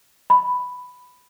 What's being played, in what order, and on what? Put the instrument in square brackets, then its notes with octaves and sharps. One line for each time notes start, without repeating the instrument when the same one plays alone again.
[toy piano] B5